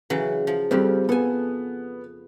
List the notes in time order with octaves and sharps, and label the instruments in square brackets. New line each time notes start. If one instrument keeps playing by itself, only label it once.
[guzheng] C#3 E3 F#3
F3
[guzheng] F2 F3 G4 [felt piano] G3 C4
[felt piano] B3 [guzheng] A4 G#5